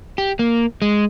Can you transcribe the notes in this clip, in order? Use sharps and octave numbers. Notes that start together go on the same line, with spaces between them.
G4
A#3
G#3